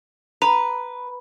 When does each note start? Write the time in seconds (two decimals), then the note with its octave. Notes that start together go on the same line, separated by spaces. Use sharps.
0.42 B4 A#5